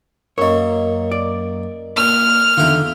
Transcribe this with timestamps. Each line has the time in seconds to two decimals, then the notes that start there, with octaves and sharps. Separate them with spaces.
0.38 F#2 A#3 A#4 C#5 D#5
1.11 D5
1.97 A#2 F6
2.57 E2 D3 D#3 F4 E5 B5